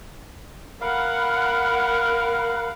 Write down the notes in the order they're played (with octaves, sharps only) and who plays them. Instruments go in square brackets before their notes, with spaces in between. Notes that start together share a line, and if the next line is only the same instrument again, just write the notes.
[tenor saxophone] A#4 [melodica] F5 [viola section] F#5 [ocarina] B5